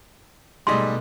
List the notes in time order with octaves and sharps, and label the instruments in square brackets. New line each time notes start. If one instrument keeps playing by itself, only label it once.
[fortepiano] G#2 G3 D#5 [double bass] B2 A3 [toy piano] C6